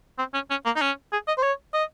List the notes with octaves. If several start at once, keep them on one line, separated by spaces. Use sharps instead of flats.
C4
C#4
C#4
A#3
D#4
C#4
G#4
D#5
C5
C#5
D#5